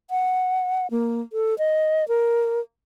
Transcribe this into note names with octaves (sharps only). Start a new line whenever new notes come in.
F#5
A#3
A4
D#5
A#4